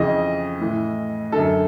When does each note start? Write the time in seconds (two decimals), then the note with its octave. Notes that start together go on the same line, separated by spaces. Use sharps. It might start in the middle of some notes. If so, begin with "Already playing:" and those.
Already playing: F2 C#3 E3 D#5
0.60 A2 E3
1.32 F#2 D3 A4